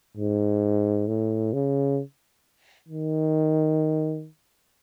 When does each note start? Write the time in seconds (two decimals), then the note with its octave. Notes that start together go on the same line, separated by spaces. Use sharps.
0.17 G#2
1.08 A2
1.53 C#3
2.89 D#3